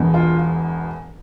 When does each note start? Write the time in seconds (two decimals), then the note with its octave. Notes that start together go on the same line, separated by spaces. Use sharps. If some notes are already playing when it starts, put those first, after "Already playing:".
Already playing: E1 E2 B2
0.14 F4